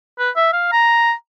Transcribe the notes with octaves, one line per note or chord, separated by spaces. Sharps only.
B4
E5
F5
A#5